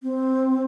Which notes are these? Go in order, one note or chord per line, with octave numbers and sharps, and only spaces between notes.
C4